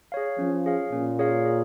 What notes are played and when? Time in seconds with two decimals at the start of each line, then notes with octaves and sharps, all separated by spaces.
0.12 G#4 C#5 F5
0.38 F3 C#4
0.66 G#4 C#5 F5
0.92 A#2 C#4
1.19 G#4 C#5 F5
1.45 G#4